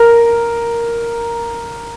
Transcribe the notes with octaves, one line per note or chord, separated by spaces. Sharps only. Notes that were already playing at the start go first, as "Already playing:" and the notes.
Already playing: A#4